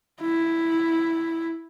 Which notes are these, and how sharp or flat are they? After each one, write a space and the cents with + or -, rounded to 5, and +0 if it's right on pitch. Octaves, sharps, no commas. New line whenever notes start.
E4 +0